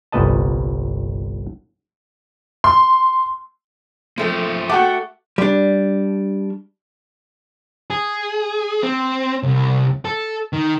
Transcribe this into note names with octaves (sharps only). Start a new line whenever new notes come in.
G1 C2 A#2 B4 D#5 A5
C6
F3 A3 A#3 C4 G#4 A#4
A3 F#4 F#5 G5 A5 D6
G3 D4
G#4
C4
C2
A4
D#3